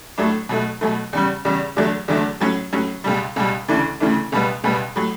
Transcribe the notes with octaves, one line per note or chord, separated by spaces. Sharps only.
A2 F#3 A3 D4
B2 F#3 A3
B2 F#3 A3
E2 C#3 G3
E2 C#3 G3
E2 D3 F#3 A3 D4
E2 D3 F#3 A3 D4
A2 F#3 C#4
A2 F#3 C#4
C#2 B2 G3
C#2 B2 G3
D2 C#3 E3 A3 D4
D2 C#3 E3 A3 D4
C#2 B2 G3 B3
C#2 B2 G3 B3
A2 F#3